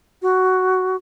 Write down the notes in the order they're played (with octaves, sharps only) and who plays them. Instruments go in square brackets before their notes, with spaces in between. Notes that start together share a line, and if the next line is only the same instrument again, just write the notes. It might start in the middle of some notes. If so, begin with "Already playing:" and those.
[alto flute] F#4